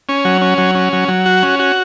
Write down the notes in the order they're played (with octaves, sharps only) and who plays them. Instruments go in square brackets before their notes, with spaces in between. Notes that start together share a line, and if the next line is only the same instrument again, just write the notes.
[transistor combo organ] C#4
F#3
C#4
F#3
C#4
F#3
F#3
F#4
C#4
F#4